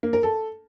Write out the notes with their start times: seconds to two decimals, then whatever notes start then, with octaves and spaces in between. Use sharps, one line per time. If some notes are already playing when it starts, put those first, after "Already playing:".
0.03 A#3
0.13 A#4
0.23 A4